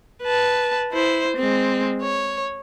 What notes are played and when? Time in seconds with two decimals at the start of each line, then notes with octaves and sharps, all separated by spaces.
0.23 B4 A5
0.93 E4 C5
1.37 G#3 C4
2.02 C#5